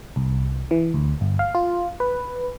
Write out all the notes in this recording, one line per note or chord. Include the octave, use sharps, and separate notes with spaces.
C2
E3
D2
G1
F5
F4
B4